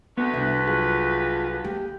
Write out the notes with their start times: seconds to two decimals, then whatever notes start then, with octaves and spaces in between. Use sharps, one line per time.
0.17 D2 B3 B4
0.33 C2 D4 E5
0.68 F#3 F4 G#4
1.64 A#3 G4